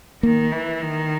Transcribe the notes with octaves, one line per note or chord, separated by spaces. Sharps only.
D#3 A#3
E3
D#3